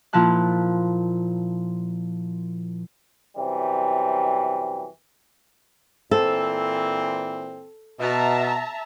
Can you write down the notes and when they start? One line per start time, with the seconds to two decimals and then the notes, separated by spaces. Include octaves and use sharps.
0.13 A#2 F3 E4 A5 F#6
3.37 F#2 C3 E3 G3
6.11 A#2 E3 C4 A4
7.99 B2 E5 A5 A#5